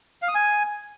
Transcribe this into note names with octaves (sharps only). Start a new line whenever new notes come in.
F5
D#6
G#5